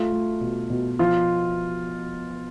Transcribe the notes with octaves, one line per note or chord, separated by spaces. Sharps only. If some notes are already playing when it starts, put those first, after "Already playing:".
Already playing: A3 F4
A3
B2
B2
F3 F4